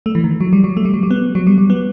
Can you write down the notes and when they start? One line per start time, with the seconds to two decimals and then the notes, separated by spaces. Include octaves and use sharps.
0.06 A3
0.15 E3
0.24 D#3
0.41 F#3
0.53 G3
0.64 F#3
0.77 A3
0.85 G3
0.94 F#3
1.03 G3
1.11 B3
1.35 F#3
1.47 G3
1.58 G3
1.70 B3